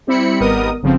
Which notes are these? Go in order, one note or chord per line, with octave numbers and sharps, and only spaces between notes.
G3 C4 E4 B5 C#7
G#1 G3 B3 A#4 D#5 D#6
G1 C#3 F3 C4